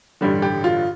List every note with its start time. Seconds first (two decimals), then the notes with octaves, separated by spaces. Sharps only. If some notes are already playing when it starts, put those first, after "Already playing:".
0.21 A1 G2 D3 G3
0.42 G4
0.64 F4